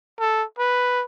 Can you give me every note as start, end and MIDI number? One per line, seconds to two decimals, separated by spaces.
0.19 0.44 69
0.59 1.04 71